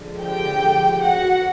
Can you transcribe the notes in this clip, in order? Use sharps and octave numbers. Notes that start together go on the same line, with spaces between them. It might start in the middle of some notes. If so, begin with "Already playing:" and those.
Already playing: D3 F3 G#3
G4 G5
F#4 F#5